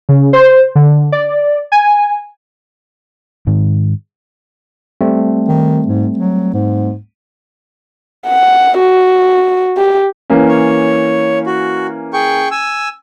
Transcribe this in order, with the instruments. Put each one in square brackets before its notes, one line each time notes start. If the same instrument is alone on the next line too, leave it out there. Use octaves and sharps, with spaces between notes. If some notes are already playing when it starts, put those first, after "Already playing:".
[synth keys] C#3
C5
D3
D5
G#5
[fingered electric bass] G#2 D#3
[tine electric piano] G3 A3 C4
[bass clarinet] D#3
G#2
F#3
G#2
[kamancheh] F#5
F#4
G4
[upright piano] E3 A#3 C#4
[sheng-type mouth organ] C#5
F#4
G#4 G5 C#6
G#5 E6